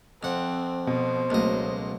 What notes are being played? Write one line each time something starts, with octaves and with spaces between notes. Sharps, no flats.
F2 C4 F#5
B2 C5
C#2 F#3 A3 A#3 D#5